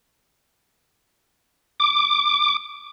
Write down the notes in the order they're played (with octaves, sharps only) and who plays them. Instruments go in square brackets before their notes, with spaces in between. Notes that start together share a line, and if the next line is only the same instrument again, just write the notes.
[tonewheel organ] D6